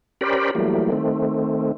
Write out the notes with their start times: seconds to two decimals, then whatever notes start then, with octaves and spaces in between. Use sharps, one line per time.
0.21 C#4 G4 A#4 C5 D5 B5
0.55 E3 F#3 G3 A3 A#3
0.92 D#3 A3 C4